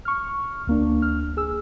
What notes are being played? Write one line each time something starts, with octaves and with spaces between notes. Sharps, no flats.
C#6 F6
D2 A#3 D4
F6
G#4 E6